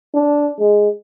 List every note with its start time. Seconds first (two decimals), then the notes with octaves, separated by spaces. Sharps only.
0.14 D4
0.60 G#3